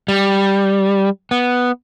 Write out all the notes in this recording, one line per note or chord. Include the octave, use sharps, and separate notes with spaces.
G3
B3